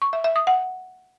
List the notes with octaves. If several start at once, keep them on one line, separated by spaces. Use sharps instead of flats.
C#6
E5
E5
D#6
F#5